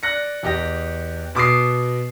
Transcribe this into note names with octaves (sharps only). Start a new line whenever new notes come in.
D5 F#6 A#6 C#7
E2 G4 D#5 A#6
B2 D6 D#6 C7